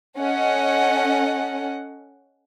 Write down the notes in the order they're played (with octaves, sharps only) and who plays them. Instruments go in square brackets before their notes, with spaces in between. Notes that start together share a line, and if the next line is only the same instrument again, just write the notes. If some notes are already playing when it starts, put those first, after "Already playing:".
[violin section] C#4 A4 D#5 F#5